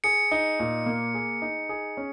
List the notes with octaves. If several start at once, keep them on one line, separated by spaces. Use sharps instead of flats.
G#4 C#7
D#4
A#2
A#3
G#4
D#4
G#4
C#4